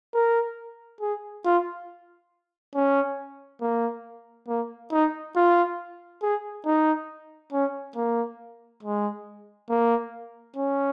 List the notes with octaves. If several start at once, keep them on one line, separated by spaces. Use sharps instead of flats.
A#4
G#4
F4
C#4
A#3
A#3
D#4
F4
G#4
D#4
C#4
A#3
G#3
A#3
C#4